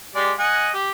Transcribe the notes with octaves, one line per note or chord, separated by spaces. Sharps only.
G#3 G4 D5
D#5 F#5 G#5
G4